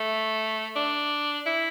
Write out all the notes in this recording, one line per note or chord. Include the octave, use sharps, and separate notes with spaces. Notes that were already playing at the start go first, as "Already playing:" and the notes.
Already playing: A3
D4
E4